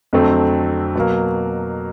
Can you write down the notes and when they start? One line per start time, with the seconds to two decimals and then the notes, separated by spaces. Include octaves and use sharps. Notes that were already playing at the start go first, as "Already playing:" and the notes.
0.13 F2 D3 F#3 A3 C4
0.95 B2 F#3 A#3